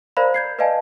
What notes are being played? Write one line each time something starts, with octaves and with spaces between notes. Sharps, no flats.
A#4 C5 D5 F5 A#5 B5
G6 G#6 C7
B4 D5 D#5 F5 G#5 A5